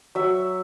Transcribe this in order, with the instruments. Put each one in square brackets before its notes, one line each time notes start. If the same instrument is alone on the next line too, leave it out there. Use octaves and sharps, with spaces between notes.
[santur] F#3 E5